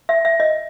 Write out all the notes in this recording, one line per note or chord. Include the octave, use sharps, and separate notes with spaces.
E5
E5
D#5